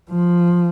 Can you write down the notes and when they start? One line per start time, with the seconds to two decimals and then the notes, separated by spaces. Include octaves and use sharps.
0.11 F3